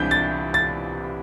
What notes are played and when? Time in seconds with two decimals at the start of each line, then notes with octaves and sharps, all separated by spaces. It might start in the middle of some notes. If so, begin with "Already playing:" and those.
Already playing: C2 C3 E3 D4 G6
0.11 A6
0.54 A6